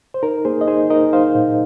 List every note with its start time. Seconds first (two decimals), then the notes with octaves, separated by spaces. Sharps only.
0.14 C5
0.23 D#4 A#4
0.45 A#3 G#4 C5
0.61 D#5
0.67 D#4 G#4 C5
0.90 D#4 A#4 D#5
1.13 D#4 C5 F5
1.35 A#2